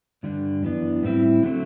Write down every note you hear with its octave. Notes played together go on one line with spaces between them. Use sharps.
G2 D3 G3 D4
F#2 E3 B3 D4
A2 G3 C4 E4
D3 F#3 A3 C4